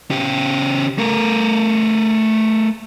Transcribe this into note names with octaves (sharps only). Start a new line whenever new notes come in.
C#3 G4
A3 A#4